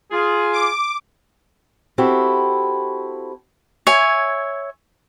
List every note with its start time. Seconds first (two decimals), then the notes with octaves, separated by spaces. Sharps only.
0.11 F4 G#4
0.53 D6
1.98 C4 E4 F#4 G4 A4
3.87 C#5 E5 G#5